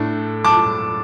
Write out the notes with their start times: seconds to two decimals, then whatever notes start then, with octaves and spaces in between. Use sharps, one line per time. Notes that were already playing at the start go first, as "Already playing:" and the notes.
Already playing: A2 A3 D4
0.44 A5 D6